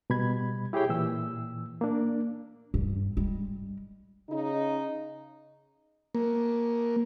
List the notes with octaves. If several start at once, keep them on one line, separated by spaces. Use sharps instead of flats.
B2 G3 B5 G#6
E4 G4 G#4 C#5 G5
A#2 E3 E6
A#3 D4
G2
G3 G#3
C#3 D#4
A#3